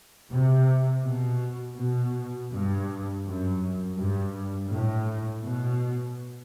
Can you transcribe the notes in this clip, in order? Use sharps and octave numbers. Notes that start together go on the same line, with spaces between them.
C3
B2
B2
G2
F#2
G2
A2
B2